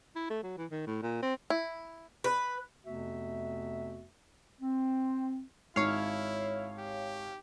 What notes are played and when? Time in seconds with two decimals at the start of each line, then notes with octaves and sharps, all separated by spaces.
0.16 E4
0.30 A3
0.43 F#3
0.58 E3
0.71 D#3
0.87 A2
1.03 A#2
1.23 C4
1.50 E4
2.24 B4
2.83 F2 C3 A3 B3 F#4 E5
4.61 C4
5.76 G#1 E4 C#5 F5
6.78 G4